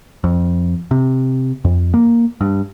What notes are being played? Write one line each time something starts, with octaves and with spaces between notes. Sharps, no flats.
F2
C3
F2
A#3
G2